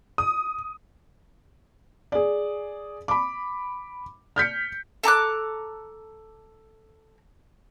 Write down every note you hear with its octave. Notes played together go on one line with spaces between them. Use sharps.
D#6
G#4 D5
B5 D6
F6 G6 B6 C#7
A4 A#5 D6 F#6